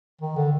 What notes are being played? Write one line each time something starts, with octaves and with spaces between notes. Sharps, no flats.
D#3
D3